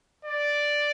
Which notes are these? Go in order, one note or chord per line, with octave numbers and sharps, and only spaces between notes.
D5